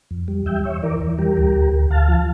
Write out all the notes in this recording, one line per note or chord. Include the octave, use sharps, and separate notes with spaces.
F2
G3
E2 E5 G5
E2 C#5 E5
E3 A#4 D5
E2
G3 G4 A#4
D2
D2
D2
D2 F5 A5
F3